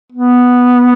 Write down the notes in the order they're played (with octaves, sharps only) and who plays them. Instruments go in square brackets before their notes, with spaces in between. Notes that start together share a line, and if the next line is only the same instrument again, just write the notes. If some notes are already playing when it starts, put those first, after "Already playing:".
[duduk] B3